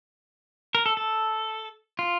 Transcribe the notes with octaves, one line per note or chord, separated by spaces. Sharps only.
A#4
A4
A4
F4